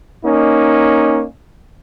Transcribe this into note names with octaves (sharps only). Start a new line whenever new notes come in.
A#3 C#4 D#4